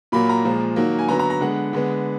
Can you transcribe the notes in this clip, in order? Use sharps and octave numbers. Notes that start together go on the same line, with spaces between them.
A#2 F#3 A#3 B5
A#5
A#2 F3 G#3
D#3 F#3 A#3
G#5
D3 F#3 B3 A#5
A#5
A#5
D3 G#3 B3 F#5
D3 G#3 B3